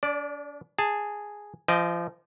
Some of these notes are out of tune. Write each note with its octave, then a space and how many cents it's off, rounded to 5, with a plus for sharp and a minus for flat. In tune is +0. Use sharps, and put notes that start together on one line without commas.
D4 -40 D5 +0
G#4 -5 A5 +10
F3 -30 D#5 +0 G5 +0